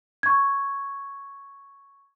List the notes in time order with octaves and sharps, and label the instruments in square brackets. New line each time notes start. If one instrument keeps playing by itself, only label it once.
[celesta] C#6 G#6